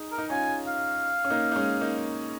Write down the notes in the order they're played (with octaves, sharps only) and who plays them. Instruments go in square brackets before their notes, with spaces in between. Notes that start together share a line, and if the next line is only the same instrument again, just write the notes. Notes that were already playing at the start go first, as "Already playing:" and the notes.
Already playing: [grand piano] D#4 G#4
[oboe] A#4
[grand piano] D#4
[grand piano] C#4 F4 [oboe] G#5
[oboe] F5
[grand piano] C#4
A#3 D#4
D#4
G#3 C#4
A#3 D#4